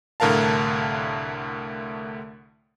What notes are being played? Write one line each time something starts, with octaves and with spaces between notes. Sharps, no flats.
C2 A2 D3 A#4 F5 A5